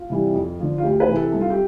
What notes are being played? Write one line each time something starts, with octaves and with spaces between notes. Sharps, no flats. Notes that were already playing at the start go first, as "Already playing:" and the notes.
Already playing: F4
C3 E3 G3
F2
D3 F3
F4
D2 G4
B4
C3 E3
A4
C2 A4
F4
G4